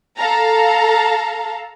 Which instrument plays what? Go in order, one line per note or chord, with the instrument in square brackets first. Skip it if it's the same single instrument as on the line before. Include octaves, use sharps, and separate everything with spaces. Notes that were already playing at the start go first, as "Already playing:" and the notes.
[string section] A4 F5 A5 A#5